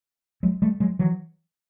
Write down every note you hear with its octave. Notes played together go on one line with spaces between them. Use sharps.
F#3 G#3
G3 A3
F#3 G#3
E3 F#3